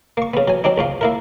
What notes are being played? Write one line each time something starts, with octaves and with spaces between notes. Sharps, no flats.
A#3 C#6
C#3 B3
F#3 G#5
F#3 C4 D4 D#4
C#2 G#2 F4
A#3 E4 A#4